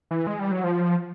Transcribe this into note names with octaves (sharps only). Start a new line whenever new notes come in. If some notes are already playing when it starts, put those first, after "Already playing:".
E3
G#3
G3
F#3
F3